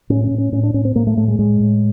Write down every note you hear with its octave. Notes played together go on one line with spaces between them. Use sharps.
A2 C#4
C#4
A2
C#4
A2 C#4
D4
A2 C#4
C4
A2 A#3
A3
A2 A3
G#3
A2 G#3
A2